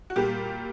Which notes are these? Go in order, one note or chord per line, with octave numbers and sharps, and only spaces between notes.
F#4
A#2 G3 G4